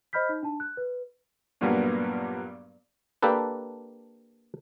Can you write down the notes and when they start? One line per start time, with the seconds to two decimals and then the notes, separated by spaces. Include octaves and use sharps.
0.13 C5 D#5 B5 F6 G6 B6
0.29 D#4
0.43 D4 A5
0.60 F#6
0.77 B4
1.61 G2 A#2 F#3 G3 A#3 B3
3.23 A#3 D4 G4 A4 B4